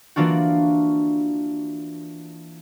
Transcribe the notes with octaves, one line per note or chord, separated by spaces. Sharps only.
E3 A#3 D4 F4 F#4